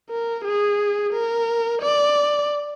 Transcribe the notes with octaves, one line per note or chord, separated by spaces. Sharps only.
A#4
G#4
A#4
D5